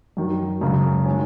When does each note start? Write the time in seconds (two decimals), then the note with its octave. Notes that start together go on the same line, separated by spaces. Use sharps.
0.17 F#2 D#3 F#3
0.61 F#2 C#3 G#3
1.06 D#3 G#3 C#4